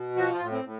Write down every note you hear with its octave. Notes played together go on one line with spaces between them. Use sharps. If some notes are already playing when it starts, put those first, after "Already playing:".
Already playing: B2
F3 F#4
F4
A2
C4
A2